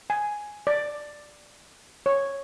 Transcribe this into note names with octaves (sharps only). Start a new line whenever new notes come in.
G#5
D5
C#5